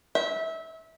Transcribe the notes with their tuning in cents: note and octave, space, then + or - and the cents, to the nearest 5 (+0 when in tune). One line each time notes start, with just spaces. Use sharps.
E5 -25